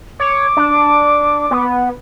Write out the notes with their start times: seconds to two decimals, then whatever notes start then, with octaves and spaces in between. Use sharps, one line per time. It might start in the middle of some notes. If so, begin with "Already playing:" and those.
0.20 C#5 D6
0.57 D4
1.51 B3